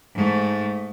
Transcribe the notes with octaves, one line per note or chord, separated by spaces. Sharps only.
G#2 A3